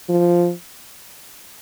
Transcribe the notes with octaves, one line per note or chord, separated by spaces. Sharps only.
F3